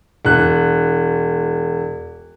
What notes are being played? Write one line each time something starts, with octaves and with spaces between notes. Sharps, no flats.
E1 F#6